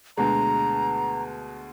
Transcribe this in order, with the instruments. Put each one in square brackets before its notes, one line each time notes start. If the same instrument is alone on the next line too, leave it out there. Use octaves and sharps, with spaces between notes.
[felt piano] D2 B2 G#3 [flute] A#5